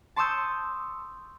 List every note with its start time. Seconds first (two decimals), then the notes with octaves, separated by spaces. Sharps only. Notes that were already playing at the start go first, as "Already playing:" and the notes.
0.16 A5 C6 C#6 D#6 E6 G6